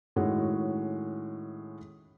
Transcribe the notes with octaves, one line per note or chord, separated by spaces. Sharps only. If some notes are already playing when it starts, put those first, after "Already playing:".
A2 D#3 G#3 C#4 F#4